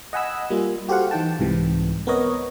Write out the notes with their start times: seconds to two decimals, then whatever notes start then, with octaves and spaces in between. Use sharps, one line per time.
0.13 D#5 F#5 G#5 B5 E6
0.50 G3 A#3 F4
0.89 F#4 G4 A4 C5 F5 F#5
1.11 E3 D#4 G5 A5
1.39 C2 G#2 C3 E3
2.07 B3 C4 A#4 B4 C#5 D#5